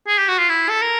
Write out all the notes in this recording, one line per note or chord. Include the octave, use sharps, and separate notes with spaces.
G#4
G4
F#4
F4
E4
A4
A#4